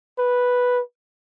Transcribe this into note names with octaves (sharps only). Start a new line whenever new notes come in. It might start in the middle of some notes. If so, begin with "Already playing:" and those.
B4